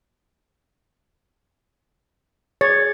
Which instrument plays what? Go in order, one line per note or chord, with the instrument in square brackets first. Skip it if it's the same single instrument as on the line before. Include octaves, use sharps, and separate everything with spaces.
[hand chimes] G#4 A6 [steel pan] C#5